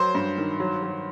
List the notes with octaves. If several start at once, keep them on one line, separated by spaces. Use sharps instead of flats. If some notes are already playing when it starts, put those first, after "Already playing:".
Already playing: F#3 C5
G2
D#3
F#3
F#3